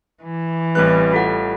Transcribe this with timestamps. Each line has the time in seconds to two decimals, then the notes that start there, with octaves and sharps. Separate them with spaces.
0.23 E3
0.75 A1 G3 C4 B4 F#6
1.12 F4 A4 F#5